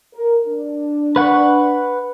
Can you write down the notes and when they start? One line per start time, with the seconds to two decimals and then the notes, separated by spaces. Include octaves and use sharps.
0.13 A#4
0.46 D4
1.16 B4 F#5 C#6